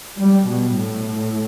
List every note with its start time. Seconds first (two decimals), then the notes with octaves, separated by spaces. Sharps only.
0.18 G3
0.47 B2
0.76 A2